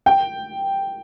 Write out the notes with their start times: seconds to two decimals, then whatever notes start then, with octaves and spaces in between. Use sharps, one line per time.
0.06 G5